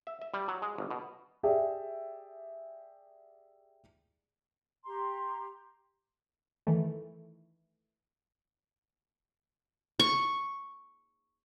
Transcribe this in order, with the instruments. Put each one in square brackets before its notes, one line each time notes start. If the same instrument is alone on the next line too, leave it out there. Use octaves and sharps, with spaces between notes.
[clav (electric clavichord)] E5
E5
G3
F#3
G#3
G1
B2
[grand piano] G4 G#4 D5 E5 G5
[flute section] G4 A#5 C6
[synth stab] D#3 E3 A3
[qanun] C#6